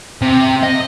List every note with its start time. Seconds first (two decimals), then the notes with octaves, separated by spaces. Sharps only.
0.22 C3
0.63 D#5